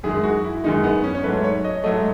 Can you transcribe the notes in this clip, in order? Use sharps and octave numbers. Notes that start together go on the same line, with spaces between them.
F#2 D#3 G#3 G#4
F#4
E4
F#2 D#3 G#3 D#4
B3
C#4
C#5
G#2 F#3 A3 B4
C#5
D#5
G#2 F#3 A3 D#5